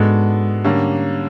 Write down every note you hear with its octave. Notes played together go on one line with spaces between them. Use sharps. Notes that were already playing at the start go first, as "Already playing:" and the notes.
Already playing: G#2 G#3 B3 D4 F#4 A4
D3 G3 A#3 C#4